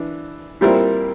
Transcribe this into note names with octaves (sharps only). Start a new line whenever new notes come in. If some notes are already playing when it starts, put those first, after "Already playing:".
Already playing: E3 D4
A#2 G3 C4 E4 A#4